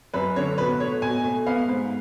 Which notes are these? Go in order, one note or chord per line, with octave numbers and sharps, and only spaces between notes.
F#2 B4
D3 C#5
B2 B4
A3 C#5
B2 G#5
A3
B3 F5
G#2